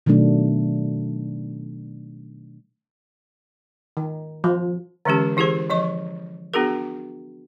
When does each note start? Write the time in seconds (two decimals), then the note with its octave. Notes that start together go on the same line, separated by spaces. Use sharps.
0.06 B2 D#3 F#3 A3 D4
3.97 D#3
4.44 F3
5.05 D3 E3 G#3 C#4 G4
5.37 E3 E4 G4 G#4 C5
5.70 F3 D#5 C#6
6.54 B3 D4 F#4 G#4 A#4